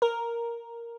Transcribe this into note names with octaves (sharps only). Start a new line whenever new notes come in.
A#4